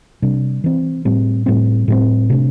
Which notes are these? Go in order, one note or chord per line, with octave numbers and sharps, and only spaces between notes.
C3 G3 D4
E3 C4
A2 G3 C4
A2 G3 C4
A2 G3 C4
C3 A3 D4